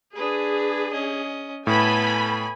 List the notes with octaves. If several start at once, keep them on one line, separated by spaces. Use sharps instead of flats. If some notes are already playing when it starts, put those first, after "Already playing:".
D4 G#4 B4
C#4 D#5
A2 B3 A4 G#5 B5